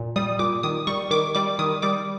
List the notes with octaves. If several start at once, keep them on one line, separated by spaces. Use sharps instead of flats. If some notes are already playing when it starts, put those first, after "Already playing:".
Already playing: A#2
G3 D#6
A#2 D6
D#3 D#6
G3 C#6
D#3 D6
G3 D6
D#3 D#6
G3 D6